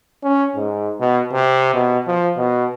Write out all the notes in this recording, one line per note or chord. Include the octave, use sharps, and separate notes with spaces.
C#4
G#2
B2
C3
B2
F3
B2